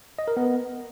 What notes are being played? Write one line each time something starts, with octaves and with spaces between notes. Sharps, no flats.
D#5
A#4
B3